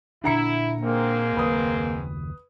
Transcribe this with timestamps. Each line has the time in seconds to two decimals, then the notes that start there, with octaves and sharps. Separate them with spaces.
0.24 A#2 D3 D4 E4 A#5 C#7
0.81 G#2 G#3 A#3 C4
1.37 F#1 D#2 B4 D#6